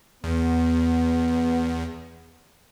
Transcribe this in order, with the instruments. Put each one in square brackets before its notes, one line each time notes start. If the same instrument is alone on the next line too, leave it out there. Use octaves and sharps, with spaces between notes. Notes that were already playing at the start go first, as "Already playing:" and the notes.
[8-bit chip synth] E2 [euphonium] B3